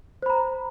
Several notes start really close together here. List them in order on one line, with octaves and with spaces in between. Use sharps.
C5 B5 A#5